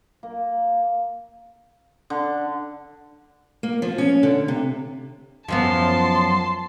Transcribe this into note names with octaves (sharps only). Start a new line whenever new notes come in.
A#3
D3
A#3
F3
C#4
D3
C3
F#2 F3 B3 A5 C6